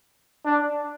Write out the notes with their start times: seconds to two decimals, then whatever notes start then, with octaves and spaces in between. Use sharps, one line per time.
0.45 D4